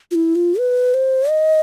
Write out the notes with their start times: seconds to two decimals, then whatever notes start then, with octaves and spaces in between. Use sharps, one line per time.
0.11 F4
0.15 E4
0.35 F4
0.59 B4
0.94 C5
1.30 D#5